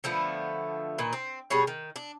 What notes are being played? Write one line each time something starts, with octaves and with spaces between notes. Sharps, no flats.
D3 F3 A3 B3
A#2 D#3 B4
C4
B2 G3 G#4 C#5
D#3
D4